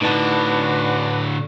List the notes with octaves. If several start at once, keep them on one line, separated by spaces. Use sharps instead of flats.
A2 D3 D4 D#4 F#4 B4 A5